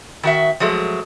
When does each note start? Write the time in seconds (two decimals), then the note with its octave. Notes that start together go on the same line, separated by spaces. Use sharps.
0.23 D#3 F#4 E5
0.60 F3 F#3 G#3 A3